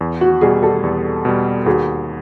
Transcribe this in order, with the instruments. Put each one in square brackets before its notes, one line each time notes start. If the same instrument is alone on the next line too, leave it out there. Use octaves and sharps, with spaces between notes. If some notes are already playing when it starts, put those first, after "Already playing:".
[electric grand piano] E2
[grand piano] F#4
[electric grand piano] B2 G3 [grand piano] F#4 G#4
[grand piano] G4 A4
[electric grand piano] E2
B2 G3
[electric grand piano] D#2 [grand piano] F#4 G#4